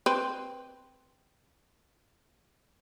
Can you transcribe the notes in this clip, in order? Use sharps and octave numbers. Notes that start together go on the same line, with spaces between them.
C4 B4